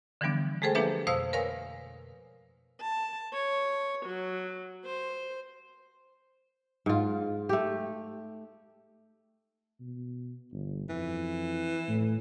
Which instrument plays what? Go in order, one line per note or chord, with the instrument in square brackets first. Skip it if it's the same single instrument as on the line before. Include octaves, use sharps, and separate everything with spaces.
[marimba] D3 E3 F3 G3 B3 D4
G#3 A3 G#4 A4 C5 G5
F3 A#3 D4 G4 B4 E5
F2 B2 C5 F5 D#6 E6
A#4 B4 C#5 F5 G#5
[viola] A5
C#5
F#3
C5
[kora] G#2 F4
A3 G4
[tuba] B2
G1
[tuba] F2 [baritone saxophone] E3
[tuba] A2